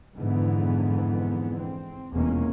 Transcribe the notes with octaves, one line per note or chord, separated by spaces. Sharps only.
F2 G#2 D3 E3 B3
C4
F1 E2 B2 G#3 A#3 C#4